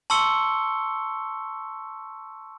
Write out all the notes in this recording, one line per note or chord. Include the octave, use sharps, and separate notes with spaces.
A5 C6 C#6 E6 C#7 G7